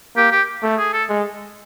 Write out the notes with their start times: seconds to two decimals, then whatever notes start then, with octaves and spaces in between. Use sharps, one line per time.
0.16 A#3 G4
0.32 G4
0.62 A3
0.78 G#4
0.93 A4
1.09 G#3